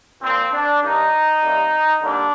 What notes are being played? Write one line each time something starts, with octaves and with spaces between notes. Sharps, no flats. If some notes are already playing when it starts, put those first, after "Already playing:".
A#2 F3 A#3 C4
D4
G2 D#3 G3 D#4
C3 D#3 G3 A#3
D3 G3 A#3 D4